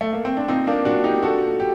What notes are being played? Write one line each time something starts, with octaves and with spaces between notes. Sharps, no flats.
A3
A#3
C4
D4
A#2 C4 D#4
A#3 D4
A#2 D4 F#4
D#4 G4
A#2 F#4 A4
G4